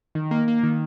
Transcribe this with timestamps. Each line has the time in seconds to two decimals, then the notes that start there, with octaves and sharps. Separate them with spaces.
0.15 D#3
0.31 A#3
0.48 A#3
0.63 D#3